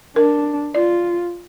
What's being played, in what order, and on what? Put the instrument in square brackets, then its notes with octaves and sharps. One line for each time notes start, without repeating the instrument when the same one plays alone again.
[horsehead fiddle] D4 [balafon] A#4
[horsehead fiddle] F4 [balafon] D5